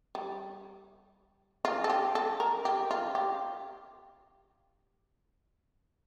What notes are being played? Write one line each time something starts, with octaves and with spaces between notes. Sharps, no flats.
G3
F4
A4
G4
A4
A#4
G4
F4
G4